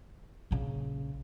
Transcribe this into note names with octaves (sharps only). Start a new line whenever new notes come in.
A#1 C#3